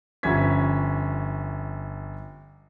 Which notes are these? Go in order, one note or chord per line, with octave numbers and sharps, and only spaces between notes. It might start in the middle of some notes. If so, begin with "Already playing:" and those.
G1 F3 C#4 E5 G#6 B6